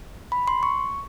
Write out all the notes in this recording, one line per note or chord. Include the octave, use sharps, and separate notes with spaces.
B5
C6
C#6